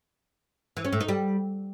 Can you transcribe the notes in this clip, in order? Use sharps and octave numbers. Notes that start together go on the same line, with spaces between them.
E3
C#4
A2
D#4
G3